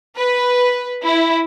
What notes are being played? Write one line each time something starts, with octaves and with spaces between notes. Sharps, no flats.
B4
E4